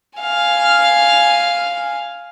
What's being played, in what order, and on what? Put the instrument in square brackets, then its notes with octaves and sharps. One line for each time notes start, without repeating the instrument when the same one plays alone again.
[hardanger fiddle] F5 G#5